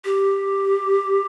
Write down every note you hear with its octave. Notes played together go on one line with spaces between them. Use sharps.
G4